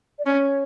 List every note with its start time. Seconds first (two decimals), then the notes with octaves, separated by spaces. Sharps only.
0.19 D5
0.25 C#4 C#5